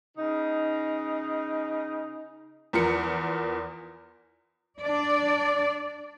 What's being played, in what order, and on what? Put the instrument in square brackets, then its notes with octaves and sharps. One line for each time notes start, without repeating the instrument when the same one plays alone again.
[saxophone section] C#3 D#4
[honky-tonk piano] E2 F3 A#4 C#7
[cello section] D4 D5